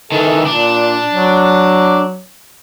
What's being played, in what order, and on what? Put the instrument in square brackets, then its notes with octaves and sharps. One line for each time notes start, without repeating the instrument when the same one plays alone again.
[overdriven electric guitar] D#3 E3 [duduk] A4
[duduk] A#2 [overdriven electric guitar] D4
[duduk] F#3